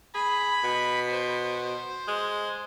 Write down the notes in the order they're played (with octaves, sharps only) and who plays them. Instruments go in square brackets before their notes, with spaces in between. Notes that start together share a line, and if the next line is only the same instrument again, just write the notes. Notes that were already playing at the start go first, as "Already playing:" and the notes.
[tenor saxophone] G#4 [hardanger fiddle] B5
[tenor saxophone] B2
[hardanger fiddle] C5
[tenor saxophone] G#3